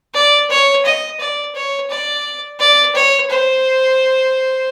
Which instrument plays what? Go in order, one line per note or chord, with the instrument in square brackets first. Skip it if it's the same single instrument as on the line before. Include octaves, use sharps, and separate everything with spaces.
[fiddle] D5
C#5
D#5
D5
C#5
D5
D5
C#5
C5